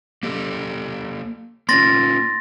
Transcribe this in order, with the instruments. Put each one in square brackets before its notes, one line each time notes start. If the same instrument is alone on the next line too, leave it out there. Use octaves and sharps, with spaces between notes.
[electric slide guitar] A#3 G4 A4
[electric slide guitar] A#3 C#4 F4 [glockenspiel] C6 A6 A#6